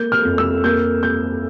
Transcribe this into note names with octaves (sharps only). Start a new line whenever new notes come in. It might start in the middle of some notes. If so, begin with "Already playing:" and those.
Already playing: A#3 G6
F6
F2
E6
A#3 G6
A#3 G6